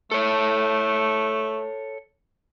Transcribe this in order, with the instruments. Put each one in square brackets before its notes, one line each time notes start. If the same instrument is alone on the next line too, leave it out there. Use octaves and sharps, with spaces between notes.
[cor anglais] A3 [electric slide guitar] A4 C#5